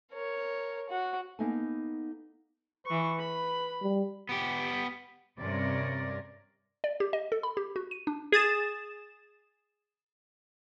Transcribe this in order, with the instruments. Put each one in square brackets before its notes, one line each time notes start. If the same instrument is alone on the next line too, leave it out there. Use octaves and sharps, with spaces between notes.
[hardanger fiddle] A#4 C#5
F#4
[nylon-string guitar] A#3 B3 D#4 A4 F#5 G#5
[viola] E3 C#6 [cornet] B4
[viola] B5
[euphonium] G3
[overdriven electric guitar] B3 G4
[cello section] G2 C3 C#4 A#4 D5
[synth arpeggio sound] D5
G4
D#5
A4
B5
G4
F#4
D#7
D4
[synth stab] G#4 D#6 A6 E7